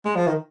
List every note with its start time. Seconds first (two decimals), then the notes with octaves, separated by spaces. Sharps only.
0.06 G#3
0.16 F3
0.27 D#3